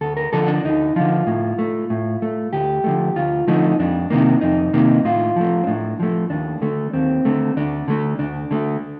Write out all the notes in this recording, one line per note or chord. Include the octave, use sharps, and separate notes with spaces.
D2 A4
A#4
D3 F3 A4
D4
D2 D#4
D3 F3 F4
A2
A3
A2
A3
D2 G4
D3 F3 A3
D2 F4
D3 F3 A3 D#4
F2 D4
C3 D#3 A#3
F2 D#4
C3 D#3 A#3
A2 F4
F3 A3
C4
A2 D4
F3 A3
D#2 D4
D3 A3
D#2 C4
D3 A3
D2 D4
D3 A3
D2 D4
D3 A3